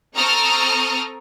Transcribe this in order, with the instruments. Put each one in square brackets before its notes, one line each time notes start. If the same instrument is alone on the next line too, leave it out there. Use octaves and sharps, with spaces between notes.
[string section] C4 A4 A#5 C#6 D#6 F6